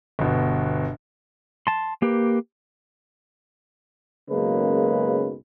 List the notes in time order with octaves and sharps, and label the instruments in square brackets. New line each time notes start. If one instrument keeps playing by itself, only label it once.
[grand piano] G1 B2
[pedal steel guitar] A5 C6
A#3 G4 B4
[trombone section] B1 F#2 C#3 G#3 A#3 B4